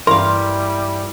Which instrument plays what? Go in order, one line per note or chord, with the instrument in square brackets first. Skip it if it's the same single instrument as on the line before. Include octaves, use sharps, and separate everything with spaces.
[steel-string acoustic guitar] G2 E3 E4 [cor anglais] G3 [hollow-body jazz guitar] A#4 F5 [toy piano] C6